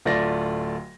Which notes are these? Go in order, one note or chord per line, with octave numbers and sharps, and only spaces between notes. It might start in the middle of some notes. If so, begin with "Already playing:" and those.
D1 A3 F4 D5 A#6